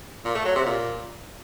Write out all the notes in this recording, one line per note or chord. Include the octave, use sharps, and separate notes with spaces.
A#2
A3
F#3
C3
A#2